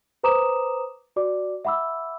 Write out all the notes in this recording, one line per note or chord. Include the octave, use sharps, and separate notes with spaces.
B4 C5 A#5 D6 D#6 E7
F#4 D5 D6
E5 F#5 B5 D6 E6